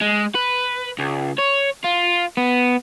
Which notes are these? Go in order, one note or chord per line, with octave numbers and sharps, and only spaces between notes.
G#3
B4
C#2
C#5
F4
B3